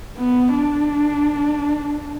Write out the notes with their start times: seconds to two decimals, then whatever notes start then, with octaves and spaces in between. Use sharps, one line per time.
0.18 B3
0.55 D4